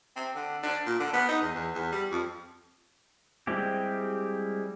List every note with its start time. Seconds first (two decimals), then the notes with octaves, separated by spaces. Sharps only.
0.16 C4
0.35 D3
0.63 D4
0.86 A#2
1.00 D3
1.13 B3
1.29 D#4
1.41 E2
1.54 E2
1.75 E2
1.92 G3
2.11 F2
3.47 G3 G#3 C4 E4 G4